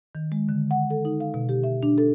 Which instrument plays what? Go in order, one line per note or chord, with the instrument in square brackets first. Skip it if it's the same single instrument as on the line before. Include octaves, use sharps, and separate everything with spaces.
[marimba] D#3
G#3
D3
F#5
A4
D#4
F5
B2
G4
E5
D4
A4